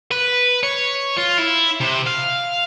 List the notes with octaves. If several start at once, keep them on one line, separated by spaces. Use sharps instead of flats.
B4
C#5
F4
E4
C3
F5